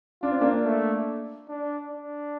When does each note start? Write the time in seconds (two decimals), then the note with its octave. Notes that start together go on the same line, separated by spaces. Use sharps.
0.22 D4 F4
0.31 C4
0.41 A#3 D4
0.65 A3
1.49 D4
1.90 D4